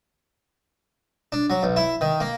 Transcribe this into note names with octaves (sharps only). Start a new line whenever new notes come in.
D4
F#3
B1
E4
D#3
A#3